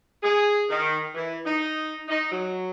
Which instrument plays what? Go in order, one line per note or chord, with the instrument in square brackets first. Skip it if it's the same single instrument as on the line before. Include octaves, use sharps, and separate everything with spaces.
[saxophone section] G#4
D#3
E3
D#4
D#4
F#3